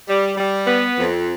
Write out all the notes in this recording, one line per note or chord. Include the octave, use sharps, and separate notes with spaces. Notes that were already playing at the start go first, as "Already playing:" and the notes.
G3
G3
B3
F2